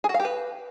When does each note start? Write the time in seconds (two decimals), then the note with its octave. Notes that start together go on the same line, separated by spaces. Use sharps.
0.04 G#4
0.09 F#4
0.14 F5
0.20 G4
0.25 B4